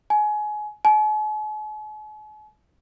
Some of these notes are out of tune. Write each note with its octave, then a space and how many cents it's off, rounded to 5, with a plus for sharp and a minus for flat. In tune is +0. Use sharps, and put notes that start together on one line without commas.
G#5 +25
G#5 +45